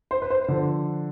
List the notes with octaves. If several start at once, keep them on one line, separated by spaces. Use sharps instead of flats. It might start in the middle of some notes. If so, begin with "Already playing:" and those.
C5
B4
C5
D3 F3